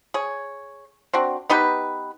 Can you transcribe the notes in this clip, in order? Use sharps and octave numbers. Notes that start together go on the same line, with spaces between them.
G#4 C#5
C4 D4 F#4
B3 D#4 G4 B4